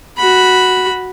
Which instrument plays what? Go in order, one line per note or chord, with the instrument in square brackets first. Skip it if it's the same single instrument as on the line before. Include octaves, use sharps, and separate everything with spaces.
[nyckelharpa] F#4 B5